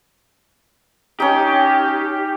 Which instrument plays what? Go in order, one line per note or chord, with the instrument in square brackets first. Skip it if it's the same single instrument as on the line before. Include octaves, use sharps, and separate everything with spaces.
[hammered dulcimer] C#4 D#4 [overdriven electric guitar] G4